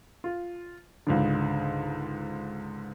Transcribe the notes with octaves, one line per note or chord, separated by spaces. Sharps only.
F4
C#2 G#2 D3